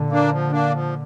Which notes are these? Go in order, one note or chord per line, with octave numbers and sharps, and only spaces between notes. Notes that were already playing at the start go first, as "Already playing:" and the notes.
Already playing: A#2 D3
A#3 D4
F3
A#3 D4
F3